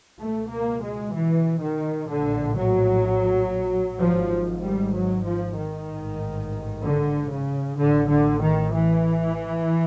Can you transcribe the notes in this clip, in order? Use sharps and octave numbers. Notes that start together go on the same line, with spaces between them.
C#2 B2 A3
A#3
G#3
E3
D#3
A#1 A2 D3
F#3
G#1 G#2 F3
G3
F#3
F3
D#3
A1 G#2
D3
C#3
A1 A2 D3
D3
D#3
E3